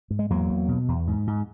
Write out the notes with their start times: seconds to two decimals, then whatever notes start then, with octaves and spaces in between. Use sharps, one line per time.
0.10 G#2
0.19 G#3
0.30 E2 F#3 A#3
0.50 E2
0.68 B2
0.88 E2
1.07 G#2
1.27 G#2